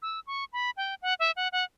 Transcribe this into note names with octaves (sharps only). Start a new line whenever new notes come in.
E6
C#6
B5
G5
F#5
E5
F#5
F#5